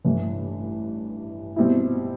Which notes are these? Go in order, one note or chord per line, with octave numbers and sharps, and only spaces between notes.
A1 G2 E3
B2 G3 C4 E4